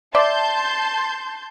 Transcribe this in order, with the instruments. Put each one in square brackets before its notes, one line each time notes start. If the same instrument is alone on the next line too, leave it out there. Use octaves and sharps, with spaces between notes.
[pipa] D5 E5 [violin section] A5 C6 G6